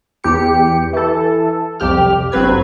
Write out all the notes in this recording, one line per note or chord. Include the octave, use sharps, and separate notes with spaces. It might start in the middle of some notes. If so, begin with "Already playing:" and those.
E2 G4 C#7
E3 A4
C2 F2 G4 F6
G1 F#3 C4 B4 G#6